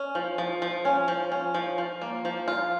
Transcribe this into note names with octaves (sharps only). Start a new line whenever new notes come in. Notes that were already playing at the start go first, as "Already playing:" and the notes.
Already playing: C#4
F3
F3
F3
C#4
F3
C#4
F3
F3
A#3
F3
F4